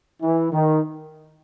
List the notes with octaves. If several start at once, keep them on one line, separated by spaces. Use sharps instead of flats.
E3
D#3